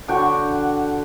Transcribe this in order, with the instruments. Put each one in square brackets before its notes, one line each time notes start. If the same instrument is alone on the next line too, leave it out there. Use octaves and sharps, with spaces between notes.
[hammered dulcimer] D3 F#4 G5 C#6